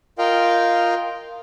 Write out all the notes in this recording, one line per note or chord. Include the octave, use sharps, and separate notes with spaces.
F4 A#4 D#5 F5 G5